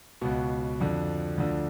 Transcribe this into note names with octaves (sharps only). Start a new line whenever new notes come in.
C#2 B2 F#4
F2 D3 F3
D2 D3 F3